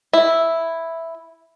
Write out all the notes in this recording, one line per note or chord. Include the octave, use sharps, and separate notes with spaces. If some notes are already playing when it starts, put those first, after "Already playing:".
E4